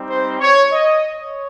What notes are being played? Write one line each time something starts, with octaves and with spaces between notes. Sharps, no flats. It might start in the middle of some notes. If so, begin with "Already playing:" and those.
Already playing: G3 C4 D#4 G4
C5
C#5
D#5
C#5